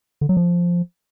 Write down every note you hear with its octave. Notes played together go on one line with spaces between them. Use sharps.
D3
F#3
F3